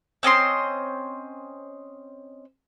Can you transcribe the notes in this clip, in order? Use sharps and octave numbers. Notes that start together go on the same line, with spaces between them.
C4 C#4 D#5 C6